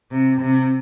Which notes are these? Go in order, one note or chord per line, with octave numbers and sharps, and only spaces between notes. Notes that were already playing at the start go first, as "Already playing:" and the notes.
C3
C3